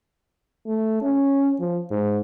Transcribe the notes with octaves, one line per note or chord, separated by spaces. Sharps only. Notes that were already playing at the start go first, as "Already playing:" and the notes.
A3
C#4
F3
G#2